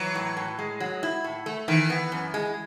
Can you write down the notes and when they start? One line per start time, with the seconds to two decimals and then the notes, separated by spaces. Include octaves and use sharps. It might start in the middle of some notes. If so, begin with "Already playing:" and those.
Already playing: E3 F#3
0.15 A2
0.37 A2
0.59 G#3
0.80 F#3
1.03 E4
1.24 A2
1.46 A3
1.68 D#3 E3
1.90 B3
2.12 F#2
2.34 G#3